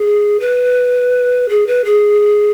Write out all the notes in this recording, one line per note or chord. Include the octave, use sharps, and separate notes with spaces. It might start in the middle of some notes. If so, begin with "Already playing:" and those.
Already playing: G#4
B4
G#4
B4
G#4